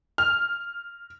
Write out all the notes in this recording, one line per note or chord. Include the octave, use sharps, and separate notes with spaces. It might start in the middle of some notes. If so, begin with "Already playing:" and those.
F6